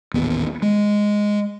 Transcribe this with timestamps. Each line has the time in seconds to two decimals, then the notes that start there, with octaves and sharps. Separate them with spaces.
0.14 D#1 A1 D#2 B3
0.62 G#3